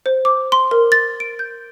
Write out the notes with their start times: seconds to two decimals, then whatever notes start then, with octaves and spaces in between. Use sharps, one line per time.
0.06 C5
0.25 D6
0.52 C6
0.71 A#4
0.92 A6
1.20 D7
1.39 G6